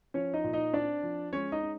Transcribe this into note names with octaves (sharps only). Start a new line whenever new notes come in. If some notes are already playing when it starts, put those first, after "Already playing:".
F3 C#4 C#5
D#4 D#5
A#2
D#4 D#5
C4 D4 D5
F3
G#3 C#4 C#5
D#4 D#5
C#4